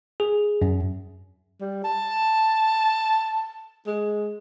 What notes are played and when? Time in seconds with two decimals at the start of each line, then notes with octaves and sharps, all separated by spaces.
0.20 G#4
0.62 F#2
1.61 G3
1.84 A5
3.86 G#3